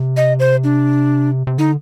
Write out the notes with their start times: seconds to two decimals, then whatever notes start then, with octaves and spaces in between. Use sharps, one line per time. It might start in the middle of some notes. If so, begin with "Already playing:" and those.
Already playing: C3
0.17 D#5
0.40 C5
0.64 D4
1.47 C3
1.58 D3 D#4